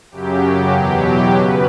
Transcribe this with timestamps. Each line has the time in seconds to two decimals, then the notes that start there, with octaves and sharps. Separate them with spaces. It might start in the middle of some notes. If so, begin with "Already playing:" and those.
0.11 F#2 C#3 F#3 G4
0.73 E2 B2 F#3
1.05 G4
1.35 F#2 C#3 B4